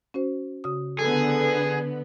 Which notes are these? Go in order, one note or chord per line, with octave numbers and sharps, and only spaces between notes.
C#4 F#4 C5
C#3 F#4 D#6
D3 B3 G#4 A4